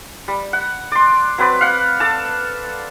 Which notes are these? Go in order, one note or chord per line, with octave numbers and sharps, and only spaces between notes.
G3
F#5
D5 C6
F#3 C4 B4 D5
F5 F#5
A4 D5 A5